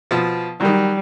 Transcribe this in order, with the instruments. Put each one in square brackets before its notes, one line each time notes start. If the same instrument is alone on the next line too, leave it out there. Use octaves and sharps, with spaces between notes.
[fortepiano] B2 F3
[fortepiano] D#3 F#3 [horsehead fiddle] G3